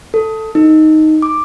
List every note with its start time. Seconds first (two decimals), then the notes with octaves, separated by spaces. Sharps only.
0.14 A4
0.55 D#4
1.22 D6